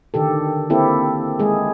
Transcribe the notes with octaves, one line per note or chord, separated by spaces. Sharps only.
D3 D#3 G4 A4
A#3 C4 E4 G4 A4
G#3 G#4